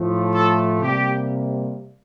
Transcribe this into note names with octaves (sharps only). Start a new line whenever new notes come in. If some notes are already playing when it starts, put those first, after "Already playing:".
Already playing: A2 F3 A3
A4
C3 G3 A#3 G4